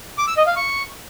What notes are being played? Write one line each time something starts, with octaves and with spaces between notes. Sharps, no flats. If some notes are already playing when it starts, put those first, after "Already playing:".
D6
E6
D#5
F5
C#6